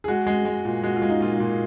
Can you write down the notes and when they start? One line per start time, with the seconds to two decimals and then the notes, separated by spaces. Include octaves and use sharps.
0.04 G#4
0.08 G#3 F#4
0.27 G#3
0.45 G#3
0.65 A#2
0.83 G#3 F#4
0.96 F4
1.02 G#3
1.09 D#4
1.21 A#2 F4
1.40 A#2